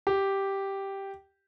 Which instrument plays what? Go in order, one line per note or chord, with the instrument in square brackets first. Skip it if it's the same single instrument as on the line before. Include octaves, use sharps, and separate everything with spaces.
[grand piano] G4